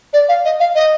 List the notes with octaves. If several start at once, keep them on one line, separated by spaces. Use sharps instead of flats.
D5
F5
D#5
F5
D#5